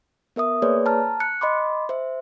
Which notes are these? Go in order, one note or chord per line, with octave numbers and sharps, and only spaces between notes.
B3 A#4 E5 D#6
A#3 G#4 B4 C#5 D5
A5 A#5 F6
F#6 C#7
D#5 B5 C6 D6
C5 E5